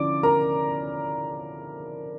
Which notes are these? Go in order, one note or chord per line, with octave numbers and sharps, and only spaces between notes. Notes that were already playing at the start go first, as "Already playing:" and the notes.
Already playing: D3 F3 C#4 E4 D5 D6
A#4 A#5